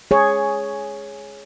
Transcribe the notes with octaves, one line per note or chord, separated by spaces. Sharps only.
G#4 C#5